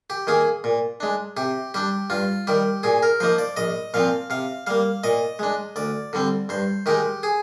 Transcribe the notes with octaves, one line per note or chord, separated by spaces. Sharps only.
G4
D#3 A#3 G#4
A#2
G#3 D4
C3 G4
G3 D4 G4
G2 F4
D#3 G3 G4
A#2 G#4
A#4
F3 A#3 D#4 C5
D5
A#1 D#5
A#2 F3 C4 F5
C3 F5
G3 A#3 F5
A#2 D#5
G#3 D4
D2 D5
D3 G3 C4
G2 C5
D#3 G#3 D#4 G4
G#4